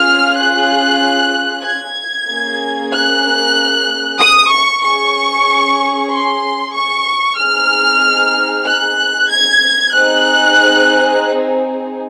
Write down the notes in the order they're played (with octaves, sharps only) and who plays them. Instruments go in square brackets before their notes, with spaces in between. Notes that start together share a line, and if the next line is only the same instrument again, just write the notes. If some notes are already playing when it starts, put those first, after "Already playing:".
Already playing: [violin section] C#4 F4 G#4 F6
F#6
G#6
A#3 C#4 G#4
F#6
D#6
C#6
C#4 G#4 C#6
C6
C#6
C4 D#4 G#4 F6
F#6
G#6
C4 D#4 G#4 F#6